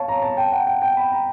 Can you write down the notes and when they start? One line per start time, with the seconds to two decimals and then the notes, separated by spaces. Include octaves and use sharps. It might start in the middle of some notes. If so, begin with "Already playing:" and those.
Already playing: C#5 F5 A5
0.08 A#5
0.22 A5
0.37 G5
0.52 F#5
0.67 G5
0.82 G5
0.97 B5
1.12 A#5